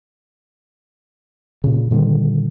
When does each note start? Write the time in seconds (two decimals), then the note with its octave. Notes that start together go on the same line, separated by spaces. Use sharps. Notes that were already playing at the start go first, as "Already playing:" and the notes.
1.64 A#2 C#3
1.91 A#2 D3 D#3 G3